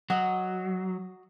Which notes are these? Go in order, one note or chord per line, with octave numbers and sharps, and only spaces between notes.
F#3 F#4 D#5